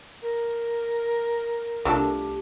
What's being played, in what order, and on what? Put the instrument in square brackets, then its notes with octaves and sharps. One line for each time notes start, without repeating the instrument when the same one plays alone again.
[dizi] A#4
[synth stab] C2 F4 [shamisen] A3 D4 A4 [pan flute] G4